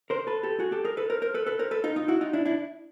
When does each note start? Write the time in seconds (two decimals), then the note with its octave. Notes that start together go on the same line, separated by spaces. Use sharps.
0.10 A#4 C5
0.27 A4 B4
0.43 G4 A4
0.60 F#4 G#4
0.72 G4 A4
0.85 G#4 A#4
0.97 A4 B4
1.10 A#4 C5
1.22 A#4 C5
1.34 A4 B4
1.46 A4 B4
1.59 A#4 C5
1.71 A4 B4
1.84 D#4 F4
1.96 D#4 F4
2.08 E4 F#4
2.21 D#4 F4
2.33 D4 E4
2.46 D4 E4